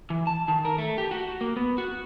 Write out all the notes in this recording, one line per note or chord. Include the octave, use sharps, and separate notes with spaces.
E3
A5
D#3
A#4
A3
G4
F#4
A#3
B3
F#4